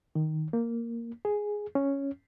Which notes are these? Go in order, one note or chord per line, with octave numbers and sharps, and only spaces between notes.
D#3
A#3
G#4
C#4